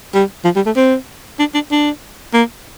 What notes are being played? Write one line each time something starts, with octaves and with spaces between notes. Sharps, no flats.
G3
F3
G3
A3
C4
D4
D4
D4
A#3